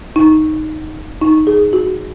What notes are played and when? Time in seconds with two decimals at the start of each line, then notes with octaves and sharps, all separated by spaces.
0.16 D#4
1.21 D#4
1.47 G#4
1.73 F#4